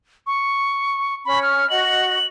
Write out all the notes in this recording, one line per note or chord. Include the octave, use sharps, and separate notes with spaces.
C#6
C#4 B5
F6
F#4 D#5 F#7